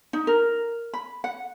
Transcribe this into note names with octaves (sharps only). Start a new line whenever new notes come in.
D#4
A#4
B5
F#5